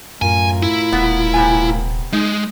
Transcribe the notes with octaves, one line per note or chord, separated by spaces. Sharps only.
F#2 A2 F4 A#4 G#5
E4
D#1 B3
C3 B3 G#5
G#3 D#4